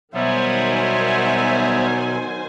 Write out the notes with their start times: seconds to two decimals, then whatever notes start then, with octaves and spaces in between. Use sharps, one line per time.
0.14 B2 D#3 F#3 G3 B3 C5 E5 G#5